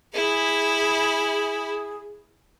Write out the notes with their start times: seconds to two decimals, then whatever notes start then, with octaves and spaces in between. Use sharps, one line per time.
0.14 E4 G#4 B5